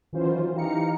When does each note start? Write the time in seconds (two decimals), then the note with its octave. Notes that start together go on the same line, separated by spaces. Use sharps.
0.13 D#3 E3 F#3 C#4 F4 C5
0.54 E3 D#4 G4 F5 A#5 C#7